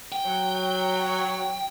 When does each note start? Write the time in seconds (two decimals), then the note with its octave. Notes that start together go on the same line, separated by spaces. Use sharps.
0.12 G5
0.26 F#3